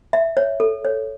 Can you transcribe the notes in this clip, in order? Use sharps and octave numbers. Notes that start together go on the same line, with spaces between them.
E5
C#5
A4
C#5